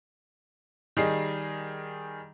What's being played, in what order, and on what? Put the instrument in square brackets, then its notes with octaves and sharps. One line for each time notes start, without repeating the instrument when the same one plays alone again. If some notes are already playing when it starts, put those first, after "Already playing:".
[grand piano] D#3 G3 G#4 D#5 C7